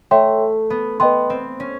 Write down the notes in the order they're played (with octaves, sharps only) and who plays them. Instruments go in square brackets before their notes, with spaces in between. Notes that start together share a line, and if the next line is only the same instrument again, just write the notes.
[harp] A3 [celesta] C#5 E5 G5 C6
[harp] B3
[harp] B3 [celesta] B4 D#5 G5 C6
[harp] C4
C#4